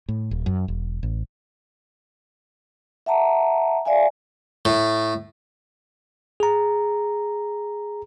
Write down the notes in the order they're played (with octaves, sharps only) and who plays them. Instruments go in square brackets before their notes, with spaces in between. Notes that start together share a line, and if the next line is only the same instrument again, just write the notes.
[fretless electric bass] A2
D#1
F#2
E1
A1
[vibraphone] E5 F#5 A5 A#5
D5 E5 F5 G#5
[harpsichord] A2
[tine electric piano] G#4 A#5